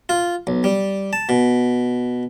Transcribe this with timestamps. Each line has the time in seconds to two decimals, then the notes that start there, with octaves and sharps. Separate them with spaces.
0.09 F4
0.47 B1
0.64 G3
1.13 A5
1.29 B2